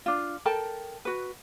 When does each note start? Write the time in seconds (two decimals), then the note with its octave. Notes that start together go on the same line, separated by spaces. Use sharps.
0.06 D4 F4
0.45 A4 A#4 G5 A5
1.05 F#4 B4